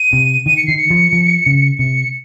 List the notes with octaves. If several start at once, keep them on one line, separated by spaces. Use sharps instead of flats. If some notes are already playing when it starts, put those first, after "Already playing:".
Already playing: D#7
C3
D#3 D#7
C#7
D#3 C7
C#7
F3
F3
C#3
C3 C#7